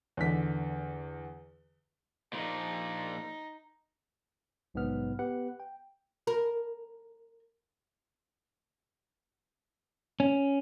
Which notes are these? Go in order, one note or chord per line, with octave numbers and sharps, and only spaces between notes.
E2 D3 B6
A#2 F3 D#4
A#1 G#2 C3 F#3 B3 F6
B3 G4 B4 F#5
G5
A#4
C#4